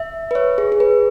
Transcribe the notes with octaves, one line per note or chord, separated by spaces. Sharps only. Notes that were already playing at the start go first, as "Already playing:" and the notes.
Already playing: E5
B4
C#5
G#4
G#4
B4